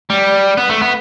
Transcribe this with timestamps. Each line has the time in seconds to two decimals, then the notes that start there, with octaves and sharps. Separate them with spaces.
0.10 G3
0.57 B3
0.69 A3
0.81 B3